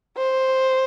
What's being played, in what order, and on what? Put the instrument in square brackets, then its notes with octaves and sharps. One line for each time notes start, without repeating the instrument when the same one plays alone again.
[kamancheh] C5